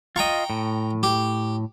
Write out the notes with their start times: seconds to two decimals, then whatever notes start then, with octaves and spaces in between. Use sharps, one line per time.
0.16 F4 D#5 G5 A#5 C#6
0.50 A2
1.03 G4